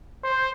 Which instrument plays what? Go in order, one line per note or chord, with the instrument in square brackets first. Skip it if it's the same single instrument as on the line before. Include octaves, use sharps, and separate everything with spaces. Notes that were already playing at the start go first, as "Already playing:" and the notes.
[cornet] C5